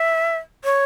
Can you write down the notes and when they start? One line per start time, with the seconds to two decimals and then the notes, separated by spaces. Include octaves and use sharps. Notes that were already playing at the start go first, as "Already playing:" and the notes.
Already playing: E5
0.64 C#5